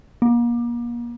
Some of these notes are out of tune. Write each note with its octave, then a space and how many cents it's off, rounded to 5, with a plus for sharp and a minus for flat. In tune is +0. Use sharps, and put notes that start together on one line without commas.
A#3 +35